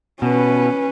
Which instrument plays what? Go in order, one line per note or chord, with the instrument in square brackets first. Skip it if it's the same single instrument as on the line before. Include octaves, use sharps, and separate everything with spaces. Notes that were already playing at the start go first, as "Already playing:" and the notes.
[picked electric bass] B2 [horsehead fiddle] C#4 B4